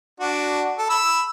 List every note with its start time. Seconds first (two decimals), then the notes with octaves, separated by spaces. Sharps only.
0.20 D4 F#4
0.78 A4
0.90 B5 E6